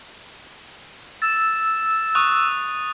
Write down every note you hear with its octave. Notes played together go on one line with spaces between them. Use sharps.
E6 A6
C#6 D#6 F#6